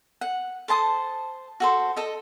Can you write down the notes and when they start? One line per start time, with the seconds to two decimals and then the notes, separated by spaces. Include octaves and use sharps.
0.21 F#5
0.68 A4 C5 A5 D#6
1.60 F#4 A4 C5
1.96 A4 D#5